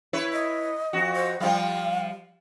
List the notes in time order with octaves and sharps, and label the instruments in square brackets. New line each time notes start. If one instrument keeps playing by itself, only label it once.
[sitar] E4 B4 C#5
[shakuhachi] D#5
[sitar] F2 F#4
[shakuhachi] C5
[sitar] F3 G3 [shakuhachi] F5